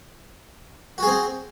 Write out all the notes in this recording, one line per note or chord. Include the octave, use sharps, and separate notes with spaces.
C4 F#4 G#4